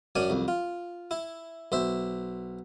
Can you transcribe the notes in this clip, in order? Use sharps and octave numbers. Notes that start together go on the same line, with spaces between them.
F#2 C#4 D4 D5 G#5
C2 F2
F4
E4
B1 C5 E5